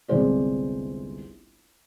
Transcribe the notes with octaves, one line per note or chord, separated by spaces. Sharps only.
G1 C2 G#3 C4 C5 D5